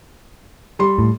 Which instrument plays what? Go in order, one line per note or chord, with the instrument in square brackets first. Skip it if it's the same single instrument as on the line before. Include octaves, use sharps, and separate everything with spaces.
[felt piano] G3 C6
[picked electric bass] A2